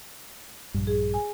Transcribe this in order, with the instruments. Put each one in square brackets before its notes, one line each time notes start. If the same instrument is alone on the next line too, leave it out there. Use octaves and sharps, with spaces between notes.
[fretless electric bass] A#1 G2
[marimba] G#4
G#5